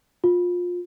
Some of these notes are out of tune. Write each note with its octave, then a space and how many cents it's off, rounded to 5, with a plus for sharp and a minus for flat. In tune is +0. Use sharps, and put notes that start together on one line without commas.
F4 +25